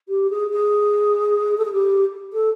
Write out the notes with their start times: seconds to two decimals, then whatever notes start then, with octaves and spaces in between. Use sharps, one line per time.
0.08 G4
0.30 G#4
0.50 G#4
1.57 A4
1.65 G#4
1.72 G4
2.33 A4